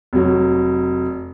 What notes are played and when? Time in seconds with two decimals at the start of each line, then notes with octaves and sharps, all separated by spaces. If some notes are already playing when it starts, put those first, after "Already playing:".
0.13 F1 F#3